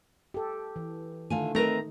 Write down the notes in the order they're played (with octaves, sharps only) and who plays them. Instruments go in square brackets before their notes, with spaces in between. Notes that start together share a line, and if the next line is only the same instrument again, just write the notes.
[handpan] G4 A4
E3
[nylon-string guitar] D3 F4 G#5 [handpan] D#3 A3
[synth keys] A3 A#5 [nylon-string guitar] C4 A#4 B4 [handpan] D#4